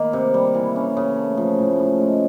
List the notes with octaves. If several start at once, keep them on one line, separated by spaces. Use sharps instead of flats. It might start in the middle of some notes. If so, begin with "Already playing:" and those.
Already playing: D#3 A#3
C3
G3
E3
C#4
C#3
A3
F3
A2
A2
G#3